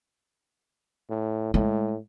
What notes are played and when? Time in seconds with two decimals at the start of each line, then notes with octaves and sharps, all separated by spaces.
1.10 A2
1.54 A2 G#3